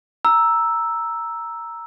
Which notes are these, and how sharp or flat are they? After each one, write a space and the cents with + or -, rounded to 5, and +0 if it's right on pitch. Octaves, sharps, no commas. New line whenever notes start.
A#5 +0 E6 +0